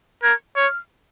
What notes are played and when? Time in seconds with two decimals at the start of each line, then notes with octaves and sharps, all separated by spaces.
0.23 A#4 G#6
0.56 C#5 F6